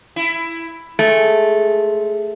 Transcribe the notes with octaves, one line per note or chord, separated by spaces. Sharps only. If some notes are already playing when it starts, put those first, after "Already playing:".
E4
G#3 A3